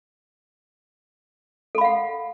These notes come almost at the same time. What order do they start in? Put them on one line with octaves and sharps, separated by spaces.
A4 B5 F5 F#5